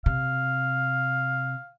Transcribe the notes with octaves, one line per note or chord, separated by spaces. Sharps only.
C3 F5